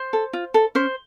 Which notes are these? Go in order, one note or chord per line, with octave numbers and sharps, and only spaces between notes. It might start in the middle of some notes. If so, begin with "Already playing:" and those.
Already playing: C5
A4
F4
A4
C#4 C5